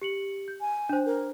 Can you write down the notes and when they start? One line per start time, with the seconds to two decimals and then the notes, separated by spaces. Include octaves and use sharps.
0.02 G4 C#7 F#7
0.48 G6
0.61 G#5
0.89 D4 C5
1.06 A#4